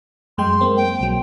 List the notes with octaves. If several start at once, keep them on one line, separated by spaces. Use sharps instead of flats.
F#2 G#3 G5 C6
A#3 C4
G5
B1 F#3